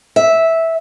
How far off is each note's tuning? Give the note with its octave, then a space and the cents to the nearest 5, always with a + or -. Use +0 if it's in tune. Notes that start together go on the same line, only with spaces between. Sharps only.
E5 -10